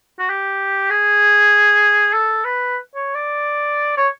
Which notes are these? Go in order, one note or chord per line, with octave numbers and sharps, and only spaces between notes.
F#4
G4
G#4
A4
B4
C#5
D5
C#5